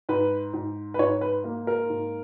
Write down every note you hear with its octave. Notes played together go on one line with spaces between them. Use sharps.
G#2 B4
G#2
B4
G#2 C#5
B4
A#3
A#4
G#2